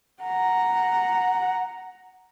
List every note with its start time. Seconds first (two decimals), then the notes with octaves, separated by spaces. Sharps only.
0.23 F#5 A#5